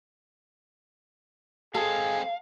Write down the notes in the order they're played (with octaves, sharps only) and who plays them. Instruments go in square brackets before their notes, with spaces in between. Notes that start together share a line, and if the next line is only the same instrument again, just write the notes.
[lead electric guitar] G#3 C4 [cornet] G#4 [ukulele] A4 [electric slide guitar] F5